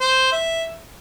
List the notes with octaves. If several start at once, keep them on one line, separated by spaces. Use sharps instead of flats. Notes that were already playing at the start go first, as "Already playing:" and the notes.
C5
E5